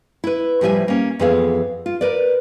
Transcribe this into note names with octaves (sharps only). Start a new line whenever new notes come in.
E4 B4
A2 F3 G3 C#5 E5 G#5
A#3 C#4
F2 E3 B3 G#4 F5
F4
A#4 B4 D5